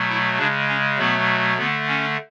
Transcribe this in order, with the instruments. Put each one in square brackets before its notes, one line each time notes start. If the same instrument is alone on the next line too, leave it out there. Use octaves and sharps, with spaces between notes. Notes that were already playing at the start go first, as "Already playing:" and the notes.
Already playing: [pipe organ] B2 F#3 A3
E4
C#3 G#3 D4
C#4
B2 F#3 A3 B3
D3 A3 B3
C#4